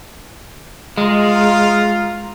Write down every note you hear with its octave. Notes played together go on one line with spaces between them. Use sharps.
G#3 F4 F5 A#5